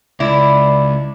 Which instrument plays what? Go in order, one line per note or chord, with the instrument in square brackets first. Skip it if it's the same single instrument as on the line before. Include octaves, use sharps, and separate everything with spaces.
[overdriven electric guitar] C#2 [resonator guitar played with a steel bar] E4 [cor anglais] D5